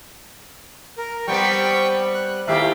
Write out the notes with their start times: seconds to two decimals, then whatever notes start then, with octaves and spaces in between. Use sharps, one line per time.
0.97 A#4
1.28 G3 B3 C4 G5 C#6
2.15 F#6
2.48 D#2 A2 G4 E5 F5